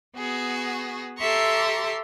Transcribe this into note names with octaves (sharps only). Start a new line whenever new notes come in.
B3 F#4 G#4
G4 A4 E5 A#5 C6 C#6